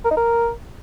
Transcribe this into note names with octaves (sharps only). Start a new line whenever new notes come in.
A#4
D#4
A#4